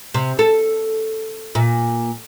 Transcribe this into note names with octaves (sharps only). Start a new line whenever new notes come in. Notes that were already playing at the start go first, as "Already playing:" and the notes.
C3
A4
A#2